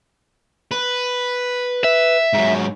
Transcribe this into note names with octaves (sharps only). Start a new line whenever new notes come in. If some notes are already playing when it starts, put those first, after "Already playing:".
B4
E5
G#2 F#3